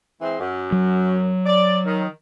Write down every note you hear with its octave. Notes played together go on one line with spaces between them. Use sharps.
E3 G#3 C4
F#2
F#3
D5
D#3